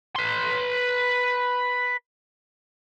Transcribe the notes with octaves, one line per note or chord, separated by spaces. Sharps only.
B4 C6